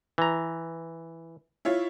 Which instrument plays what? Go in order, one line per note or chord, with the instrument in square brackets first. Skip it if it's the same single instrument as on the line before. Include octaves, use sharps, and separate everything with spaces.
[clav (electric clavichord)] E3 A#5
[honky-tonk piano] E4 F4 C#5